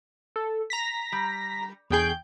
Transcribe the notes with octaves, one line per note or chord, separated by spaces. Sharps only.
A4
A#5 A#6 B6
G3
E2 B2 G#4 G5 G6